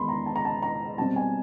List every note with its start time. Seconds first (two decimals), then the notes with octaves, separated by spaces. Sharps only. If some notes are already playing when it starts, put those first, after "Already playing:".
Already playing: E2 D#3 G#3 B3 B5 C6
0.09 A#5
0.26 A5
0.36 A#5
0.45 A5
0.62 A#5
0.98 B2 G3 C4 A5
1.16 G#5